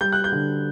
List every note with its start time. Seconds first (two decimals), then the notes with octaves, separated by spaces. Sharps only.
0.01 G3 G6
0.12 F#6
0.24 G6
0.32 D3